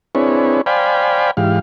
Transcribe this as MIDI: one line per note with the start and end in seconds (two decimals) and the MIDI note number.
0.15 0.61 60
0.15 0.61 62
0.15 0.61 64
0.15 0.61 68
0.15 0.61 71
0.15 0.61 73
0.66 1.31 72
0.66 1.31 74
0.66 1.31 77
0.66 1.31 79
0.66 1.31 80
0.66 1.31 83
1.37 1.59 44
1.37 1.59 52
1.37 1.59 67
1.37 1.59 77